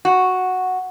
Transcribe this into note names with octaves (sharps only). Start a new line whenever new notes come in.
F#4